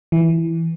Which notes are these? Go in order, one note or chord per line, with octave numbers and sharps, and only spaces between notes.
E3